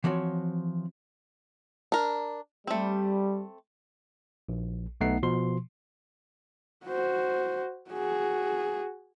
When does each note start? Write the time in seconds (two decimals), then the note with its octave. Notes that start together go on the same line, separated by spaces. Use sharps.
0.04 E3 F3 C4 F#4 C#5
1.92 D4 A#4
2.67 G3 A3 C4
4.49 A#1
5.01 B1 A3 B3 D#4 F#5 C7
5.23 B2 F3 C6
6.86 F#4 C5
7.90 F#4 G#4